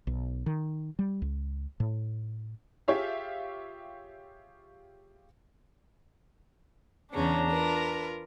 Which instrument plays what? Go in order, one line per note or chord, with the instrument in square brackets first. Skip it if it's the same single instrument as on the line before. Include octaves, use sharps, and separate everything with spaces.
[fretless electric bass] B1
D#3
G3
C#2
A2
[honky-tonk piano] F4 G4 G#4 C#5 E5 F5
[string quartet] E2 C#3 C#4 [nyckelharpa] D4 A#5
[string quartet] F4 A#4 B4